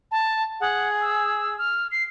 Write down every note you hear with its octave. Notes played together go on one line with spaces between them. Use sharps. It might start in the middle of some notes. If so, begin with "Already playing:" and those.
A5
G#4 F#5
E6
F6
C7